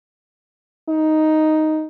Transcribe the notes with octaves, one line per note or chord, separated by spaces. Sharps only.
D#4